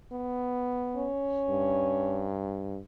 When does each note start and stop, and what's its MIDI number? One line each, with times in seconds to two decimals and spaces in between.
0.12 1.08 59
0.96 2.30 61
1.50 2.80 43